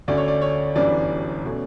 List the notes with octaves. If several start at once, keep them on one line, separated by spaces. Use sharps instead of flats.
D2 D3 A3 C#4 D5
C#5
D5
C#5
G1 F#2 E3 G3 D4 D5
B2 A3 C#4